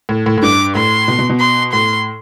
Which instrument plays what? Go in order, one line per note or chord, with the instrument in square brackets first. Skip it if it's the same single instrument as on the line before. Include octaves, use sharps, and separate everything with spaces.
[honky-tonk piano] A2
A2
A2
[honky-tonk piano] G2 [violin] D6
[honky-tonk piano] A2 [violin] C6
[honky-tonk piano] B2
B2
B2
[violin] C6
[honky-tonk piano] A2 [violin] C6